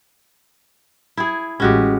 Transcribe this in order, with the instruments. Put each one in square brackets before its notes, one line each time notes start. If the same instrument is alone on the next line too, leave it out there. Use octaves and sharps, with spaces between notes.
[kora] E4 G#4
[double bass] A1 G#3 [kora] C#4 F#4 G4